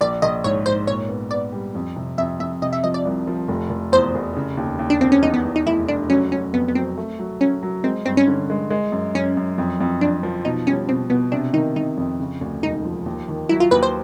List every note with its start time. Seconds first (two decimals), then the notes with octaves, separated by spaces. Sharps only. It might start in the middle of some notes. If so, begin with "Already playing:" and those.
0.01 A#1 D5
0.22 A#1 D#5
0.44 G#2 C#5
0.66 G#2 C5
0.87 A#2 C#5
1.09 B3
1.31 B3 D5
1.53 G3
1.75 F2
1.96 C3
2.18 F2 E5
2.40 F2 E5
2.62 C3 D#5
2.73 E5
2.84 F3 D#5
2.94 D5
3.05 C2
3.27 F3
3.48 F1
3.70 F1
3.92 E2 C5
4.15 F1
4.36 C#3
4.57 D#2
4.79 D#2
4.90 D4
5.00 D#2 C4
5.12 C#4
5.23 E2 D#4
5.34 B3
5.45 E2
5.56 D#4
5.66 F1 E4
5.88 F1 D4
6.09 F#3 C#4
6.31 F#3 C#4
6.53 F2 B3
6.68 B3
6.75 F#3 C4
6.98 A3
7.19 F#3
7.41 F#3 C#4
7.63 F#3
7.84 G#3 C4
8.06 G2 C4
8.17 C#4
8.27 D3
8.50 G#3
8.70 G#3
8.92 F#2
9.15 F#2 C#4
9.37 F#2
9.58 F2
9.80 F2
10.01 F2 D4
10.23 F3
10.45 B2 D#4
10.67 G3 C#4
10.88 B2 C4
11.10 B2 B3
11.32 C3 D4
11.53 D#3 D#4
11.76 D#3 D#4
11.97 F2
12.20 C#3
12.41 D2
12.63 E1 D#4
12.85 F3
13.06 D#2
13.28 D#3
13.49 F#3 E4
13.60 F4
13.71 D#2 B4
13.83 C5